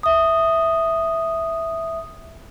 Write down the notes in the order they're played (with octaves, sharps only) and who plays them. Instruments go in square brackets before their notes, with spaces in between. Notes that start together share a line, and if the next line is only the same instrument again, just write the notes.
[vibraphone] E5 D#6